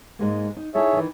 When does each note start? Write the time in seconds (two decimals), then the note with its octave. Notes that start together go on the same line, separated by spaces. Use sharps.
0.19 G#2 G#3 A#3
0.57 D#4
0.75 D#4 E4 G#4 A4 C#5 E5
0.93 D#3 E3